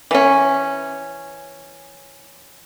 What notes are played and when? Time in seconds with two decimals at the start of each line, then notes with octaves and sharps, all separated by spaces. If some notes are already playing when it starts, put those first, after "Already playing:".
0.11 E3 C#4